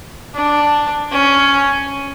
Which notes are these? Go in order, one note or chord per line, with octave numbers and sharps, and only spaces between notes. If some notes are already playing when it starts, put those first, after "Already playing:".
D4
C#4